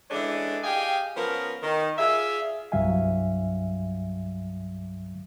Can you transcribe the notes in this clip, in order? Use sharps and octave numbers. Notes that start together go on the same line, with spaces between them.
E3 G#3 A3 C#4 D4
G4 G#4 D#5 F5 G5 G#5
F3 B3 C#4 A#4
D#3
F4 G#4 D5 E5
C2 G2 F#3 E5 F5 G#5